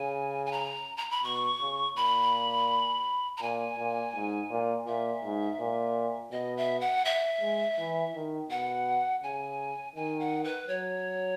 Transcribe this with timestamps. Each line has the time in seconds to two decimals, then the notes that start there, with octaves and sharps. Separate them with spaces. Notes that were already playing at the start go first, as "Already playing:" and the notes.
Already playing: C#3 G#5
0.46 G#5
0.52 A#5
0.97 A#5
1.10 B5
1.24 B2 C#6
1.61 C#3
1.96 A#2 B5
3.37 A#5
3.41 A#2 G#5
3.78 A#2
4.15 G#2
4.50 A#2
4.87 A#2 E5
5.24 G#2
5.60 A#2
6.32 B2 D#5
6.57 E5
6.80 F#5
7.05 E5
7.41 G#3
7.78 E3
8.15 D#3
8.50 B2 F#5
9.23 C#3 G#5
9.96 D#3 G#5
10.20 F#5
10.44 B4
10.68 F#3 C#5